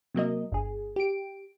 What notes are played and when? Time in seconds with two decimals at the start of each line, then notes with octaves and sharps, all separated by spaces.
0.14 C3 F#3 A#3 D#5
0.52 G1 G#4
0.96 G4 D7